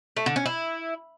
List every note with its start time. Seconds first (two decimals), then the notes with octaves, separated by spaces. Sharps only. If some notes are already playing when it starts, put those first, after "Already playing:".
0.17 A3
0.26 D3
0.36 C#4
0.46 E4